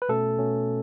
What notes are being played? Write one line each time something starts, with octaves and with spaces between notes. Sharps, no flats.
B4
B2 A3 C#4 A4
B2 A3 C#4